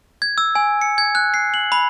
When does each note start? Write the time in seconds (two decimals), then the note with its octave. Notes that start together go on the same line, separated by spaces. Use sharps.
0.22 G#6
0.38 E6
0.55 G#5
0.82 C#7
0.98 G#6
1.15 F#6
1.34 C7
1.54 F#7
1.72 B5